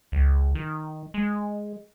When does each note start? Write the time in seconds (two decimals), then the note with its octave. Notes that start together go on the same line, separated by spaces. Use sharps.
0.12 C#2
0.55 D#3
1.14 G#3